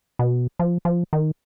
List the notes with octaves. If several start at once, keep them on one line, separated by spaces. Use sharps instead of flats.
B2
F3
F3
D#3